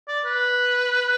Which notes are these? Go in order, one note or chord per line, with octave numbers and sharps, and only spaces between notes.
D5
B4